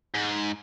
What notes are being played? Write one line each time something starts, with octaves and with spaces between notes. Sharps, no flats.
G#2